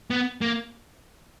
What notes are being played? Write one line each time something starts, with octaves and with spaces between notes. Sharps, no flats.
B3
A#3